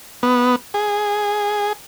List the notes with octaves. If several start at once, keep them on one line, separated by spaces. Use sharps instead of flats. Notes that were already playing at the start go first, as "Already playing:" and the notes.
B3
G#4